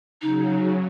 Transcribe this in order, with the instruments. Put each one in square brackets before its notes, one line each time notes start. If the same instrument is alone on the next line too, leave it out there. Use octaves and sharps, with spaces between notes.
[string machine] C#3 F#3 [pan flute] D#4